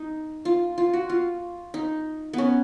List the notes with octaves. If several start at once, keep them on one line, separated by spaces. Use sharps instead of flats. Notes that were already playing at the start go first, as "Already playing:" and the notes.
Already playing: D#4
F4
F4
F#4
F4
D#4
B3 C#4